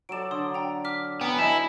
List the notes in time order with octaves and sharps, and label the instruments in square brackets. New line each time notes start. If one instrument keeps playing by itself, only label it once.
[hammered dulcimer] F#3 A4 D5 [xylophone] D7 E7
[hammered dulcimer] D3 [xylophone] C6 D#6
[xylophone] G5 A#5
D6 F6 B6
[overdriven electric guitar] B3 [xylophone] G5 [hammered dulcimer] G#5 A#5 B5
[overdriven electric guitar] E4 [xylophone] D#5 A5